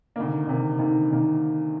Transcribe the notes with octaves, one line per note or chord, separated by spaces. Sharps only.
D2 C3 D#3 A#3
D2 C3 D#3 A#3
D2 C3 D#3 A#3
C3 D#3 A#3